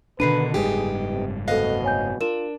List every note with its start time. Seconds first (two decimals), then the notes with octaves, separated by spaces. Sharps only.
0.20 B2 D3 D#3 D4 A#4 B4 C7 D#7
0.54 F#1 G#2 G3 B3 D#4 G4 G#4
1.13 C3
1.48 D2 B2 A4 D#5 F5 F#6
1.84 C#5 G#5 G6
2.21 D4 F4 A#4 E7